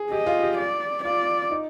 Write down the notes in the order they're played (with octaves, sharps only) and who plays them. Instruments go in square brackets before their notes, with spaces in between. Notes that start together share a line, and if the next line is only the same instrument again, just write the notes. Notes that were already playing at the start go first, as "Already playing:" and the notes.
Already playing: [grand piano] G#4
[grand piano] G4 [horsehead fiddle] D#5
[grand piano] F4
G4
[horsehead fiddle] D5
[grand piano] F4 [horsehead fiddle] D5
[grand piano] D#4